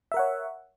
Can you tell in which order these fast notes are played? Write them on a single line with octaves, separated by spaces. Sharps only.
E5 A#4 F#5 C#5